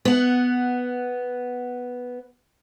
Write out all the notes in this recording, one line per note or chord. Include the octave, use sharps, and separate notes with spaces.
B3 F#5